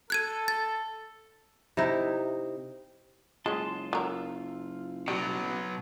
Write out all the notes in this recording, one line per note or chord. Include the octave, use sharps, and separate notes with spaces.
A4 F#6 G#6 D#7
A6
C3 D#4 E4
F#1 G#3 C#4 F4 A5 C6
F#3 F4 A#4 E6
B2 F#3 G3